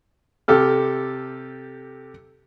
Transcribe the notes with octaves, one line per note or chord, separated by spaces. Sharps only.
C3 G4 A4 F6